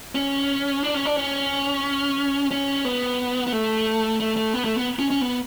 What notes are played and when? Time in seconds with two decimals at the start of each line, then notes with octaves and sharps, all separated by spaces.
0.15 C#4
0.83 D4
0.94 C#4
1.05 D4
1.16 C#4
2.51 C#4
2.85 B3
3.47 B3
3.52 A3
4.20 A3
4.36 A3
4.54 B3
4.64 A3
4.76 B3
4.99 C#4
5.10 C#4
5.21 B3